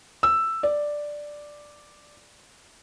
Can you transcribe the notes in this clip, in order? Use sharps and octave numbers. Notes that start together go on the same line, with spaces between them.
E6
D5